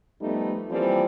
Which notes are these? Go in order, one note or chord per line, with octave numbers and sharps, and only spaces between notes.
F3 G3 A3 B3 D#4
E3 F3 G3 A#3 C4